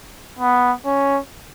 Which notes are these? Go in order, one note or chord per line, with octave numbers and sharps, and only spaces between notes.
B3
C#4